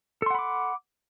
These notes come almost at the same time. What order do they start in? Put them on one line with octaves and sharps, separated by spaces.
A4 C6 F#5 B5 D6